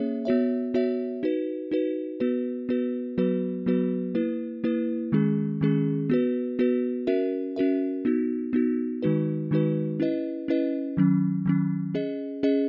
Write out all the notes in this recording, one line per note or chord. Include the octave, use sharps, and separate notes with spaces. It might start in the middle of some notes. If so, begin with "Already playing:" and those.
Already playing: A#3 C#4 G#4 C#5 E5
B3 F#4 C#5 E5
B3 F#4 C#5 E5
D#4 F#4 B4
D#4 F#4 B4
B3 F#4 B4
B3 F#4 B4
F#3 B3 F#4 B4
F#3 B3 F#4 B4
A#3 E4 B4
A#3 E4 B4
D#3 G#3 C#4 G#4
D#3 G#3 C#4 G#4
B3 F#4 B4
B3 F#4 B4
C#4 F#4 A#4 E5
C#4 F#4 A#4 E5
B3 D#4 F#4
B3 D#4 F#4
D#3 G#3 D#4 F#4 B4
D#3 G#3 D#4 F#4 B4
C#4 E4 B4 D#5
C#4 E4 B4 D#5
D#3 F#3 C#4
D#3 F#3 C#4
C#4 G#4 D#5
C#4 G#4 D#5